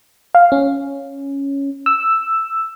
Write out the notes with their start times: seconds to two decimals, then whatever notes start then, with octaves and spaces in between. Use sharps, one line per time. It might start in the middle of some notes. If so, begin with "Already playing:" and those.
0.35 F5
0.52 C#4
1.86 E6